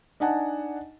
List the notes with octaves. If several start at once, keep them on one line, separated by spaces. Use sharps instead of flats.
D4 D#4 D#5 F#5 G#5 A5